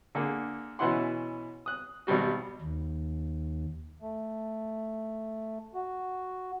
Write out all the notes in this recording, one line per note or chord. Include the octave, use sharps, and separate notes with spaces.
D3 A#3 G#4
B2 E3 C#4 E4 F#5 C6
D#6 F#6
G#1 B2 G3 F#4
D#2
A3
F#4